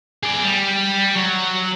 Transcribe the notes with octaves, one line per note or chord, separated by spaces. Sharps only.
G#4 D5
G3
F#3